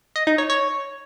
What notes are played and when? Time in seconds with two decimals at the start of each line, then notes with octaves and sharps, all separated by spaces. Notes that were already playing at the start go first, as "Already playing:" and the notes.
0.16 D#5
0.27 D#4
0.38 C#5
0.50 C#5